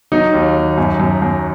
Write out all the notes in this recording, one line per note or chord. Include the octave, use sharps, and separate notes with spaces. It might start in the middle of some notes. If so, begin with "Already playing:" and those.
F#3 D#4
D#2
D#2
F#2
F#2
F#2